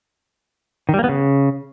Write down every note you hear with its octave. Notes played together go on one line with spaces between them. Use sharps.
D#3
G3
A#3
B3
C#3